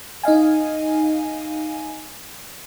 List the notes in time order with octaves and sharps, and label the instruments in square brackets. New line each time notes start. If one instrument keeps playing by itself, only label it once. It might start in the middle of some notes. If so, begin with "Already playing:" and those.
[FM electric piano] D#4 D#5 F5 G#5